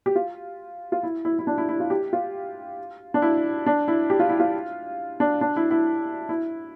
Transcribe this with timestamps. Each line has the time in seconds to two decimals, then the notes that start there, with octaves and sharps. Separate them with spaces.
0.06 G4
0.16 F4
0.92 F4
1.03 E4
1.25 E4
1.39 E4
1.47 D4
1.58 E4
1.69 E4
1.80 F4
1.90 G4
2.13 F4
3.14 D4
3.22 E4
3.66 D4
3.88 E4
4.10 G4
4.20 F4
4.29 E4
4.40 F4
5.20 D4
5.41 D4
5.56 E4
5.71 E4
6.29 E4